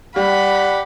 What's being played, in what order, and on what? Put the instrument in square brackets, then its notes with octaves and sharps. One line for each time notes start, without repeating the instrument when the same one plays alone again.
[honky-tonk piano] G3 [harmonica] G4 F#5 [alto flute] D5 [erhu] B5